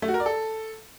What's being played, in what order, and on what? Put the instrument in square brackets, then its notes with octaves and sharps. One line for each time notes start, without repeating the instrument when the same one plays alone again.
[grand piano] A3
F#4
A#4
D5
A4